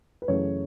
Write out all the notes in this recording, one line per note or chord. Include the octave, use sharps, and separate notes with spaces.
B4
F#2 C#3 E3 A3 C#5